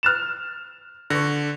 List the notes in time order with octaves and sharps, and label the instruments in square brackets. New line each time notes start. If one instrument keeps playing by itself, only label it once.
[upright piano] F6 A6 E7
[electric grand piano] D3 [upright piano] C#6 A#6